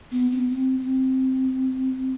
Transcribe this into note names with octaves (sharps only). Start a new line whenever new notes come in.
B3
C4
B3
C4
C4